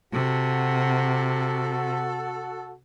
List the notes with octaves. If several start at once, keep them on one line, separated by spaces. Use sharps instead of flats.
C3 F#4 A4